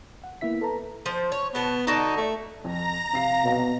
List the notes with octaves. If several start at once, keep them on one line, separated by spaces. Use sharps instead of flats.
F#5
A#3 B3 E4 E5 B6
A4 B4 A5 A#5
F3 C5
C#5
B2 B3 A5
D3 D#4 F#4 A5
A3
F2 A#5 A#6
C3 F5 C7
B2